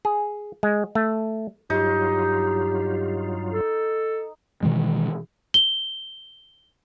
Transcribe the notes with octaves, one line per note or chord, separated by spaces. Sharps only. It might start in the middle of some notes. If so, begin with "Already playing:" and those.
G#4
G#3
A3
G2 F#3 D#4 F4 G4
A4
B2 D#3 E3 G#3
G7